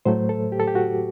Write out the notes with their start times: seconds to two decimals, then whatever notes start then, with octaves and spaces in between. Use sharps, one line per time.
0.05 A2 F#3 A3 C5
0.29 A4
0.52 G4
0.60 A4
0.67 G4
0.75 F#4